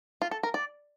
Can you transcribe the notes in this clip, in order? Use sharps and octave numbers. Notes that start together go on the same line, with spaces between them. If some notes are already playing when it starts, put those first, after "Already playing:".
F4
A4
A#4
D5